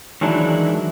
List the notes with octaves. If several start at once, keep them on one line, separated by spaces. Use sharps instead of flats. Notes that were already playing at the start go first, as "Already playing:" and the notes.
D#3 E3 F#3 G#3 D4 E4